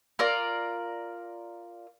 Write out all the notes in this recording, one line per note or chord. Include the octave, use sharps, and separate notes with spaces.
F4 A#4 D5